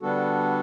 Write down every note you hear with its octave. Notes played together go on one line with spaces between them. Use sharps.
D3 G3 B3 D4 F#4 A4